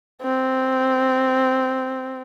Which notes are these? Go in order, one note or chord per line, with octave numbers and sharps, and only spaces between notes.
C4